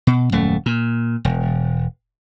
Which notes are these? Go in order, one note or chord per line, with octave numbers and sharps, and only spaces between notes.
B2
D#1 F#2 A3
A#2
E1